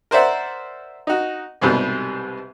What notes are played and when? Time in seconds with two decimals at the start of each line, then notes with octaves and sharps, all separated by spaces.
0.11 A#4 C5 D5 E5 F#5
1.07 D#4 F#4
1.61 C2 G#2 B2 G3